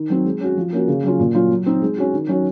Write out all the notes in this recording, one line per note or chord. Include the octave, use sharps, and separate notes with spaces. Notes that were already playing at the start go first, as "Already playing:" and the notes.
Already playing: D#3
F#3 C4 D#4
G#3
C#4 F#4
F3
A#3 C#4 F#4
C#3
F#3 C#4 F4
A#2
F#3 C#4 F4
F#3
C4 D#4
G#3
C#4 F#4
D#3
F#3 C#4 F#4 C#5